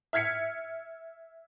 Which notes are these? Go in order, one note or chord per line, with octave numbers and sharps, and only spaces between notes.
E5 F6 G#6 B6 C#7